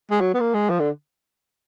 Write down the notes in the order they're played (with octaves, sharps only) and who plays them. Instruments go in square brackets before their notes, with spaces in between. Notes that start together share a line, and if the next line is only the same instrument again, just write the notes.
[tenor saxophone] G#3
F#3
B3
A#3
G#3
F3
D3